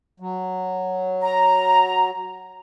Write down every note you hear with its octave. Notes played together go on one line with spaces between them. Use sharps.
F#3
A#5